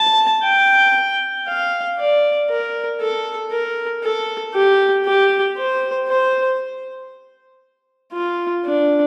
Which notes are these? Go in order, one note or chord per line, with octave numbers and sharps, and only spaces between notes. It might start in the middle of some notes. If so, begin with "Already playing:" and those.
Already playing: A5
G5
F5
D5
A#4
A4
A#4
A4
G4
G4
C5
C5
F4
D4